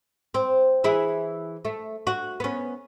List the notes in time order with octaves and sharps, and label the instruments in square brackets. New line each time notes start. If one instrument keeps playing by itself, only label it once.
[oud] C4
E3 E4 G#4
A3
F#4
B3 C#4